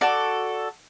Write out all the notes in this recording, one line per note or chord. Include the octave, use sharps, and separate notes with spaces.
F#4 A4 D5